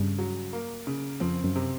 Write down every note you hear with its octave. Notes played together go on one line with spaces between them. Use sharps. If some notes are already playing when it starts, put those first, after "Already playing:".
Already playing: G2 C#3 G3
F#3
A#3
C#3
F2 F3 C4
F#2 F#3
C3